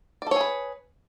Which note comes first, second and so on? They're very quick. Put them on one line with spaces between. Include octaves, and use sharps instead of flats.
D5 A4 C#5 G#4 B4